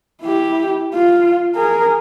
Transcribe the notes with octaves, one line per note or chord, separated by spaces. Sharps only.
E4 G4
F4
G#4 A#4